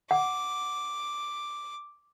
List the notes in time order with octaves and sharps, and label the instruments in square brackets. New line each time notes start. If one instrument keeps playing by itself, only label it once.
[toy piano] F#5 [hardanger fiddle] D6